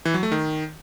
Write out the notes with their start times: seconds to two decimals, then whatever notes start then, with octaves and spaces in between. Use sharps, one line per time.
0.05 E3
0.14 F#3
0.23 A3
0.32 D#3